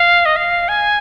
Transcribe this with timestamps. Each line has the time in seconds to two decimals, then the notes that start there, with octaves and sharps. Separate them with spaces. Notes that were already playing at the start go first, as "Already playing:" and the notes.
Already playing: F5
0.25 D#5
0.36 F5
0.68 G#5